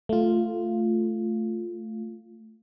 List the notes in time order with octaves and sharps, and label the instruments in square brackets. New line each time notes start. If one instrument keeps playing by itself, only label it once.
[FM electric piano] A3 F4